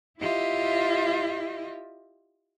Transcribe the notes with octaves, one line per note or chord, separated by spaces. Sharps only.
E4 F4 G4 D#5 E5